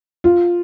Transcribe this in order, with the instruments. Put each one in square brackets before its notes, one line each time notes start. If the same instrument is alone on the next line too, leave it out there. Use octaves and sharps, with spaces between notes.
[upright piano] F4